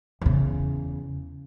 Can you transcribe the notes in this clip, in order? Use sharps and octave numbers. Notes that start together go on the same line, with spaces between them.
E2 C#3